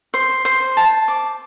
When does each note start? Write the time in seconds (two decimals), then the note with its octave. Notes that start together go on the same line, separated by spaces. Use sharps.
0.14 C5
0.45 C5
0.77 A5
1.08 D6